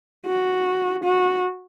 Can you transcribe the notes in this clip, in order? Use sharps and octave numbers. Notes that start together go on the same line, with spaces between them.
F#4
F#4